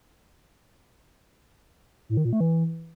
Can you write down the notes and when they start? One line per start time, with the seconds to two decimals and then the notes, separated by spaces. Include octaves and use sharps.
2.09 A2
2.17 D#3
2.25 A#2
2.33 A3
2.40 E3